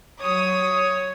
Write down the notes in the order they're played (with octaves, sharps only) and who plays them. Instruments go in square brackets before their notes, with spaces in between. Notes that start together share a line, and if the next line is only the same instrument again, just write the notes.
[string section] F#3 D#6 [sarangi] C#5